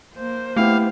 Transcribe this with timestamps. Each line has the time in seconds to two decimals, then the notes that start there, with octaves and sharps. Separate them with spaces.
0.15 A#3 C5
0.57 A3 B3 E4 G4 F5